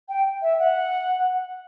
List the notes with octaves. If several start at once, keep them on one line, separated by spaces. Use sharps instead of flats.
G5
E5
F#5